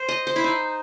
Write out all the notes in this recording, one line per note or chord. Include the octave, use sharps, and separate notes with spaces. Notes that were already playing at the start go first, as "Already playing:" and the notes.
Already playing: C5
D#5
C5
E4
D#4